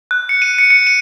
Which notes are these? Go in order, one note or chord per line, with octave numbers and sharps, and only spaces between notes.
F#6
C#7
D#7
C#7
C#7
D#7